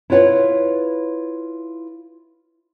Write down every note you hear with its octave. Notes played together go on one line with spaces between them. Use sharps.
E4 F4 B4 C#5 F#5